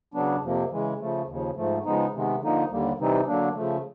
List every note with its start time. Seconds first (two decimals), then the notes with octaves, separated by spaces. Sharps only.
0.14 C#3 F#3 B3 D4
0.42 F2 C3 F3 A#3
0.71 C#3 E3 G#3
0.99 C#3 F3 A3
1.28 D#2 C#3 F3
1.56 G#2 F3 A3
1.85 C#3 F3 G#3 B3 D#4
2.14 C3 D#3 G#3 B3
2.41 D3 F3 A#3 D#4
2.70 D#2 D3 G3 A#3
2.98 C3 E3 G3 C4 D#4
3.26 D3 F#3 A#3 D4
3.55 C#3 F3 A3